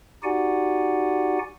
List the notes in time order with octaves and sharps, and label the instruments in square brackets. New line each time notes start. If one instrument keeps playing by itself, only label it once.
[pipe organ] D#4 F#4 G4 D5 F#5 G#5